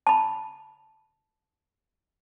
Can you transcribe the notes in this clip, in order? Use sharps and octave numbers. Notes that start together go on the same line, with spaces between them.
A5 B5